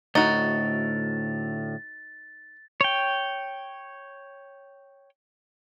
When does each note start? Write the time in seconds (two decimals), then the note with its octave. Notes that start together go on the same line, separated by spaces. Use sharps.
0.15 D2 A2 D#4 F#4 A6
2.81 C#5 G5